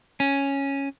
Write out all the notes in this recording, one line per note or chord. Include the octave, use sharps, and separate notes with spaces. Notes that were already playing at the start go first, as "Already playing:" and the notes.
C#4